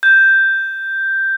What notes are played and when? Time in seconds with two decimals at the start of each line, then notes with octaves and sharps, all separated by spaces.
0.03 G6